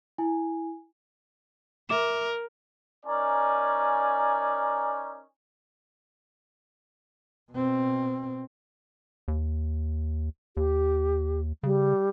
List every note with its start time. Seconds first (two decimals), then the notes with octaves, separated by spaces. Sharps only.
0.18 E4 G#5
1.89 A#4 E5 D6 E7
3.06 C#4 D#4 A#4 D5 G#5
7.52 B2 C4
9.28 D#2
10.57 D#2 G4
11.63 C#3 G3